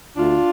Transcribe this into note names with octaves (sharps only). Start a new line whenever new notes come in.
D2 D4 F4